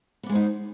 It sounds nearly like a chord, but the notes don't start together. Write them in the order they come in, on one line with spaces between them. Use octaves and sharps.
B3 D4 G#3 C5 D#4